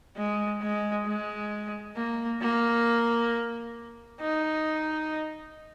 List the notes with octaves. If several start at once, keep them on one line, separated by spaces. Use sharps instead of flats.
G#3
G#3
G#3
A#3
A#3
D#4